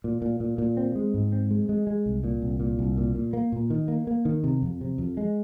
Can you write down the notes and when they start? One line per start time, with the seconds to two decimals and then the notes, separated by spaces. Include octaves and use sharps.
0.04 A#2
0.22 A#2
0.40 A#2
0.58 A#2
0.77 C4
0.95 G#3
1.14 G#2
1.32 C4
1.51 G#3
1.69 G#3
1.87 G#3
2.06 C2
2.24 A#2
2.42 C2
2.60 A#2
2.79 C2
2.98 A#2
3.15 A#2
3.33 A#3
3.52 A#2
3.70 D#3
3.88 A#3
4.07 A#3
4.25 D#3
4.44 C3
4.62 F2
4.81 C3
4.98 F2
5.17 G#3